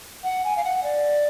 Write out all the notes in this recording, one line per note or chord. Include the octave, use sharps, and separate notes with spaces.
F#5
G#5
F5
F#5
D5